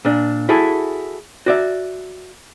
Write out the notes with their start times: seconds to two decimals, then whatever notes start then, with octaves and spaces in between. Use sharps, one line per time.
0.05 A#2 D4
0.49 E4 F#4 G#4 A4
1.46 F#4 D5 E5